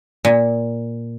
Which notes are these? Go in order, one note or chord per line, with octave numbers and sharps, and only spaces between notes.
A#2